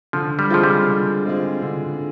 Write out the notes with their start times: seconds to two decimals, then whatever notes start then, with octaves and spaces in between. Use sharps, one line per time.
0.13 D3 F3
0.39 G3
0.50 F3 G#3 C4 F4 G#4
0.64 G3
0.88 D3
1.25 G#3 C4 F4 G#4
1.62 D3